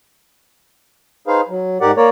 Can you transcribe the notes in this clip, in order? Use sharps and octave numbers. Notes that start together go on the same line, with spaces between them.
D#4 G#4 B4 C5 F5
F#3
G#2 G4 A#4 D5 F#5
A#3 A#4 C#5 D5